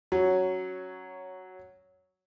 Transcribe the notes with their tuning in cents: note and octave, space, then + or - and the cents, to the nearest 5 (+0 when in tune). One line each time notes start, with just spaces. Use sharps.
F#3 +5 C#4 +0